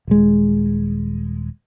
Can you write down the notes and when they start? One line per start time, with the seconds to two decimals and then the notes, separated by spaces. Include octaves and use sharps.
0.08 D#1 G#3